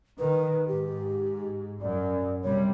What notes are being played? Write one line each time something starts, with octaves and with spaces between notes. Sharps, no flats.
D#3 B4
G#2 G4
F#2 D5
C3 G3 C#5